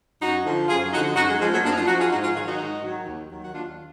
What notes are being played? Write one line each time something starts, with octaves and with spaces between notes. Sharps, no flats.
F#2 D#4 F#4
D3 F3
F#2 F4 G#4
D3 F3 D#4 F#4
F#2 D#4 F#4
G#3
F3 G#3
F#3 A#3
F#2 A#3 D4
D#4
D4 F4
F3 D#4 F#4
F4 G#4
G#2 D#4 F#4
F4 G#4
D#3 F#3 F4 G#4
D#4 F#4
G#2
D#3 F#3
D#2
D#3 F#3
F#4
D#2 D4 F4